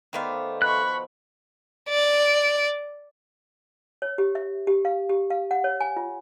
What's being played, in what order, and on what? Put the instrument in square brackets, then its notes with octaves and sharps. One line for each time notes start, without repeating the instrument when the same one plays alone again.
[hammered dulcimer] D#3 C5 D5 [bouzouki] A3 B3 F5
[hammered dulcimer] B2 F3 A4 [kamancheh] B5 C#6 [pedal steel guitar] F#6
[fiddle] D5
[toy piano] C#5
G4
E5
G4
F5
G4
F5
F#5
C#5
G#5
F4